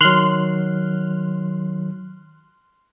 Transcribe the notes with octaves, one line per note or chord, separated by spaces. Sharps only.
D#3 F#3 C6 F6 F#6